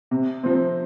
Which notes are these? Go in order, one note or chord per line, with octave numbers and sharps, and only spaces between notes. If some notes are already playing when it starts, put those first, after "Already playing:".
C3
F3 C4